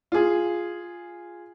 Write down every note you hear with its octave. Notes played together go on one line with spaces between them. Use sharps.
F4 G#4